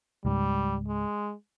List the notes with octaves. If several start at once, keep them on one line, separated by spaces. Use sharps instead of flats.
C#2 G#2 G3
G#3